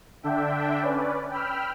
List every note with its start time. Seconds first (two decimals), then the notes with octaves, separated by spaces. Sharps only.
0.23 D3 D4 E5 G5
0.82 C#4 B4 D5
1.31 G5 B5 E6 F6